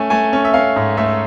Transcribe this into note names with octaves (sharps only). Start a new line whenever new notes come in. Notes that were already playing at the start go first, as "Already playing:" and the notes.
Already playing: A3 C#4 G#5
A3 G#5
C#4
E5
C#4 F5
G#2
A3 E5